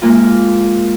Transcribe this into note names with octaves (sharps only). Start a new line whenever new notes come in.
G#3 A#3 F4